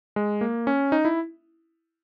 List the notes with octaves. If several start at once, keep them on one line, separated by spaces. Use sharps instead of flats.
G#3
A#3
C#4
D#4
E4